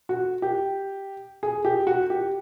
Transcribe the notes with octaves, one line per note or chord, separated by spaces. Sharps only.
F#4
G4
G#4
G4
F#4
G4